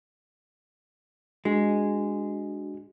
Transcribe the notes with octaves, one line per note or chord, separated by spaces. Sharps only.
G#3 D4 F#4